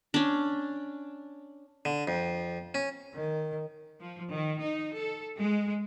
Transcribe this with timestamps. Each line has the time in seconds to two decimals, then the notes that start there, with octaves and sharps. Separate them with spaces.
0.14 C#4 D4
1.85 D3
2.08 F2
2.75 C#4
3.14 D#3
3.99 F3
4.32 D#3
4.62 D#4
4.97 A4
5.37 G#3